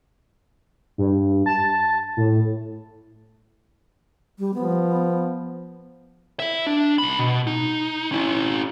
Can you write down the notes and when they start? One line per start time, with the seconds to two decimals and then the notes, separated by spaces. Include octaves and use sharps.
0.98 G2
1.46 A5
2.17 A2
4.39 G3
4.54 F3 B3
6.40 E4 E5
6.67 D4
6.98 C2 B5
7.19 B2
7.47 D#4
8.12 C#4 E4